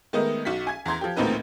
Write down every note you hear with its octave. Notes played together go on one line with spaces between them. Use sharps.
D#3 G#3 A3 B3 A#4 D#5
B1 F#4 B6
G#5 G#6
E2 A#5 C6 G#6
F3 G4
A1 D2 A#2 C4 D#4 B4